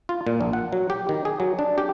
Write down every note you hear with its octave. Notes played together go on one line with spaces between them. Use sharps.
F4
A#2
A#1
F#5
F#3
G4
D#3
G#4
F#3
D4
G4